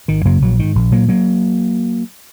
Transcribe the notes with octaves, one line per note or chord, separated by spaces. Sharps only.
G#1 D#3
F#2 C#3 F#3 A#3
A#1 F#3
G#2 D#3
A#1
A#2 F#3 A#3
F#3 A#3